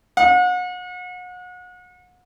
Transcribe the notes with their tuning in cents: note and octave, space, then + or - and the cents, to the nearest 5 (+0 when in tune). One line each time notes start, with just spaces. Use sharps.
F#5 -35